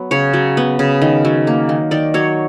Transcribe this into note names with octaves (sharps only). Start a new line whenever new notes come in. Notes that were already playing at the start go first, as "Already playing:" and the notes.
Already playing: F#3 B3
C#3 C#5
F#3
B3
C#3
D#3
F#3
A#3
D#3
D#3 D5
F#3 C#5